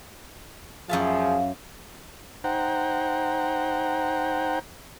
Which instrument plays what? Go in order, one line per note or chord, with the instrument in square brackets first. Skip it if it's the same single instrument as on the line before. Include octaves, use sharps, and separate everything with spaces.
[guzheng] F#2 E5 A5 [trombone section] F3 G#4 [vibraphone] F5
[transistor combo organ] D#4 C5 F#5 G5 A#5